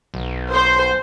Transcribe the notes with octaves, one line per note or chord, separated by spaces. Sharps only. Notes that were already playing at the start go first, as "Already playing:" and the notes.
B1
C5